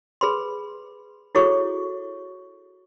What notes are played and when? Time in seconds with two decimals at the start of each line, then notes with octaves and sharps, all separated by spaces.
0.21 G#4 B4 B5 C6
1.35 E4 F#4 G#4 A4 C#5 C#6